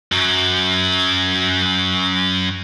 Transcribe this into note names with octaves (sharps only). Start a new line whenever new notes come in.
F#2 F#3